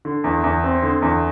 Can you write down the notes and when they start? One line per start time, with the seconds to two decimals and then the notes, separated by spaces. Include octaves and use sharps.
0.05 D3
0.24 E2
0.44 E2
0.64 C4
0.83 D3
1.02 E2